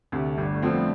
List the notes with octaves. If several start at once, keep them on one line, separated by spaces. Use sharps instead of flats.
D2 C3 A3
G1 G3
A3
F2 D3 F3 C4
B3